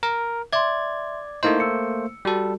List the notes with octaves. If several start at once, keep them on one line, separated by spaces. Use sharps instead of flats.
A#4
D5 E5 C6 G#6
A3 A#3 D#4 E4 C5 D#5
E6 C#7
G3 F#4 A4